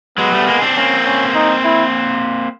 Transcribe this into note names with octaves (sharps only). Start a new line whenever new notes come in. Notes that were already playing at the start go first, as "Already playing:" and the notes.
F#3 G#3 B3
G3 A3
G#3 A#3
C4 D4
A#3 C4 C#4
C#4
D#4
E4